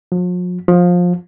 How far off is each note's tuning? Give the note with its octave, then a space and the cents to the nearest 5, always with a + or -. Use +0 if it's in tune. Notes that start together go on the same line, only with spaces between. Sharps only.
F3 +45
F3 +20